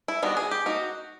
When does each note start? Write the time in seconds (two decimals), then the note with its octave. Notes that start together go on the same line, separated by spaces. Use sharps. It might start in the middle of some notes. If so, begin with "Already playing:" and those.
0.08 E4
0.23 D#3 G3 B3 D4 F#4
0.37 G#4
0.51 G4
0.66 A#3 D#4 F#4